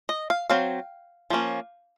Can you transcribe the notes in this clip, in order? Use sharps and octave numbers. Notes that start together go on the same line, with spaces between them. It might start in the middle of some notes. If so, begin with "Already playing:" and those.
D#5
F5
F#3 C4 F5
F3 A#3 C#4